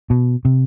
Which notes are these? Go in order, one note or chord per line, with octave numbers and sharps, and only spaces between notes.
B2
C3